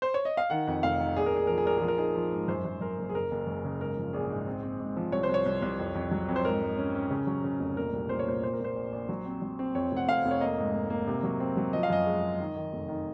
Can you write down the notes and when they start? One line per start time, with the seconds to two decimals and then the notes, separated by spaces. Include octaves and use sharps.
0.02 C5
0.14 C#5
0.25 D#5
0.37 F5
0.50 D#3 F#5
0.67 F2
0.83 F1 F5
0.99 D#3
1.16 A#1 G#4
1.26 A#4
1.32 A#1 G#4
1.47 F3 A#4
1.58 G#4
1.65 A#1 A#4
1.78 F3 G#4
1.88 A#4
1.98 D#4 G#4
2.15 F3
2.32 G#2
2.48 F#2 C5
2.65 F#2
2.81 F#2 A#4
2.98 F#1
3.09 G#4
3.15 F#1 A#4
3.31 F#1
3.47 F#2
3.64 C#3
3.80 G#2 A#4
3.97 F3
4.13 A#1 G#4
4.30 G#2
4.47 C4
4.63 C4
4.80 G#2
4.97 F3
5.12 C2 C#5
5.23 C5
5.29 C2
5.34 C#5
5.46 C2
5.62 C2
5.79 F2
5.95 F2
6.11 F#3
6.29 F2
6.36 C5
6.44 G#2 A#4
6.62 G#2
6.77 C#4
6.95 C#4
7.10 C#3
7.27 F#3
7.44 C#3
7.60 F1
7.77 A#2 A#4
7.93 C2
8.09 A#2 C5
8.19 C#5
8.26 A#2 C5
8.43 A#2 C5
8.53 A#4
8.60 A#2 C5
8.76 A#1
8.92 A#1
9.09 F#3
9.26 C4
9.42 F#3
9.59 C4
9.75 F2 C#5
9.92 F1 F#5
10.08 F1 F5
10.25 F1
10.31 C#5
10.41 A#3 D#5
10.58 G#2
10.74 A#3
10.90 A#3
11.07 C3
11.23 F#3
11.40 C4
11.57 F#3
11.73 F3 D#5
11.83 F5
11.90 F#2 D#5
12.06 G#3
12.22 G#3
12.40 D#3
12.56 D#3
12.73 F1
12.88 D#3